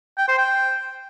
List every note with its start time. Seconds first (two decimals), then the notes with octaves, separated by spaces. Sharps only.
0.18 G5
0.28 C5
0.38 G5